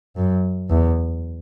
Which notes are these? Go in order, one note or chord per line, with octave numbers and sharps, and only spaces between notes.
F#2
E2